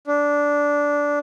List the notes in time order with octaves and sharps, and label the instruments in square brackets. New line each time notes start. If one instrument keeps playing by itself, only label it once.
[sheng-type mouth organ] D4